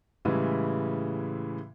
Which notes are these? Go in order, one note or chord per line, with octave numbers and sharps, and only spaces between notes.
A2 C#3 E3 G3 G#3 E4